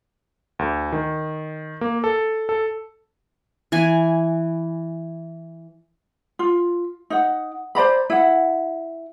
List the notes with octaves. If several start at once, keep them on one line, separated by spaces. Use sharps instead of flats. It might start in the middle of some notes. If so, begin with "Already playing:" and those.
D2
D#3
A#3
A4
A4
E3 G#5
F4
D#4 F#5
C5 D5 A#5 B5
E4 F#5